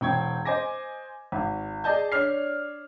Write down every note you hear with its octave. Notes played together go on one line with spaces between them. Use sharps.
E1 C4 G5 C#6 G#6
C5 D#5 G#5 D6 A#6
G#1
G#4 D5 D#5 A5 G6
D4 C#5 D5 F6 C7